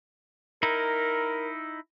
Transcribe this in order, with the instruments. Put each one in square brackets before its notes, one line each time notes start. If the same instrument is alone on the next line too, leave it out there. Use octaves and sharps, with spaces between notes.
[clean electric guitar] D#4 E4 [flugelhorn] A#4